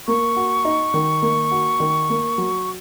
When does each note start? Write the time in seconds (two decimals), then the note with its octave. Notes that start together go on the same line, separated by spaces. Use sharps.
0.07 A#3 C#6
0.36 F#4
0.65 D#4
0.94 D#3
1.22 A#3
1.51 F#4
1.80 D#3
2.10 A#3
2.38 F#3